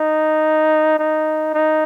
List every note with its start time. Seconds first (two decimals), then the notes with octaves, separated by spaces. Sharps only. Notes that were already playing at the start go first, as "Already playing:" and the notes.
Already playing: D#4
0.99 D#4
1.54 D#4